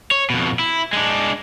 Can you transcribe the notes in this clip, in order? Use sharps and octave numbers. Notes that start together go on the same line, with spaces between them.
C#5
F2 B2
E4
G#3 D4